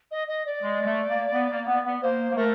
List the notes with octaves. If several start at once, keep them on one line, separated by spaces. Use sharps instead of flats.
D#5
D#5
D5
G#3
G#3
A3
A#3
B3
A#3
B3
B3
A#3 C5
A#3
A3 A#4